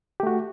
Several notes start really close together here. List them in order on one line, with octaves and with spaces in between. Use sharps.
G4 A3 F#4